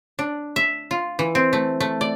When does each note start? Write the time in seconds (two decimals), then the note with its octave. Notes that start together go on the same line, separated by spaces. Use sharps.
0.19 D4
0.56 E5
0.91 F4
1.19 E3
1.35 C4
1.53 A3
1.80 A3
2.01 D5